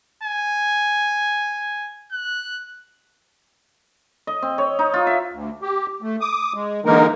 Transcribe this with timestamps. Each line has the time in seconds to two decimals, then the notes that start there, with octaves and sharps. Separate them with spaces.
0.23 G#5
2.12 F#6
4.27 D#5
4.42 C4
4.58 C#5
4.79 D#4
4.94 F4
5.07 E5
5.32 D2
5.62 G4
6.02 A3
6.21 D6 D#6
6.55 G#3
6.85 D3 E3 G#3 A#3 D#4 A#4